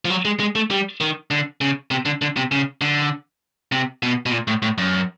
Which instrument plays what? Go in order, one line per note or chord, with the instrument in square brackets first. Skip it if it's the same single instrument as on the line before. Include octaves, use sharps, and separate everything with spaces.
[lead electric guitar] F3
F#3
G#3
G#3
A3
G3
D#3
D3
C#3
C3
D3
D3
C3
C#3
D3
C3
B2
B2
A#2
A2
A2
F#2